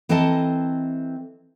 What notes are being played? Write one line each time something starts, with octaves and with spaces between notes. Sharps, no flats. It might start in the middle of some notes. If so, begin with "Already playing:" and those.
E3 C4 A4 A#4 D#5 A5